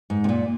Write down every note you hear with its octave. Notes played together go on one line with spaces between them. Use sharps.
G#2
C3
A#2